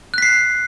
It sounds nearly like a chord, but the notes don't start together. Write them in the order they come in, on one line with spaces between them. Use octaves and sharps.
F#6 B6 C7